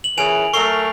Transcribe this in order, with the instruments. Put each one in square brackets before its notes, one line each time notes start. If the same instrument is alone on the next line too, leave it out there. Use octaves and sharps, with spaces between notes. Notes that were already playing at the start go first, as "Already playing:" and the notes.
[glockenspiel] F#7
[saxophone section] A#2 C#3 E3 [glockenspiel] G#5 D7 F7
[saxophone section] F#3 A3 A#4 [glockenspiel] C#6 C7 F7